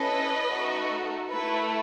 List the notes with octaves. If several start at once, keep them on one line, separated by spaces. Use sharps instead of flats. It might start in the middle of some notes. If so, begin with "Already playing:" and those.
Already playing: C#4 E4 A4 B4 D#5
A3 D#4 F#4 A4
A3 E4 A4 B4